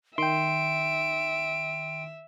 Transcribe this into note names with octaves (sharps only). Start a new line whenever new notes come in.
D#3 E5 G5 C6 D7